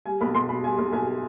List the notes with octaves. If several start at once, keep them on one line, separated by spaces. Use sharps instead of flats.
G3 G#5
B1 B5
B1 C6
B2 B5
G3 G#5
B1
B1 G#5
B2